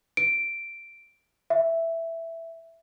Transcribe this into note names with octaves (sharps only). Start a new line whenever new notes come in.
D7
E5